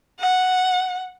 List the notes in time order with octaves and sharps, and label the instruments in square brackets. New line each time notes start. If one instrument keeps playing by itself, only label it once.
[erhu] F#5